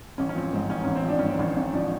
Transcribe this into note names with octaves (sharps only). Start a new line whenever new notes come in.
A1 C#4
C#4
F3 C4
G#2 C4
A1 C#4
A1 C#4
C4
F3 D4
G#2 C#4
C4
A1 C#4
A1
F3 D4